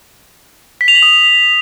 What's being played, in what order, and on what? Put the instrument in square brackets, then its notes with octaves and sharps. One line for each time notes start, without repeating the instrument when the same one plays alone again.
[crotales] B6
F7
F#7
D#6